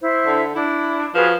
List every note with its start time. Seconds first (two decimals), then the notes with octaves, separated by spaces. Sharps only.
0.02 E4 C5
0.26 D3
0.55 D4 E4
1.14 F3 F#4 G#4 B4